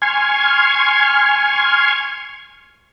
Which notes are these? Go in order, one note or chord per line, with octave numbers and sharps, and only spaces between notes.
G#5 C6 C#6 F6 G#6